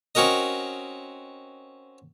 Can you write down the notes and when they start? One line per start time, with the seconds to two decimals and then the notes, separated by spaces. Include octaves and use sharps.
0.15 C4 C#4 F#4 A#4 D#5